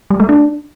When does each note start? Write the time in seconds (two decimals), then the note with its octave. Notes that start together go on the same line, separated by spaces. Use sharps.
0.10 G3
0.20 A3
0.29 D4